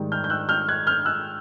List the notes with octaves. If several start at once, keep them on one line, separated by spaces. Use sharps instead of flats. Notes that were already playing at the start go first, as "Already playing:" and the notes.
Already playing: G#2 D#3 G3
F6 G6
G6
E6 F#6
F6 G6
F#6 G#6
F6 G6
E6 F#6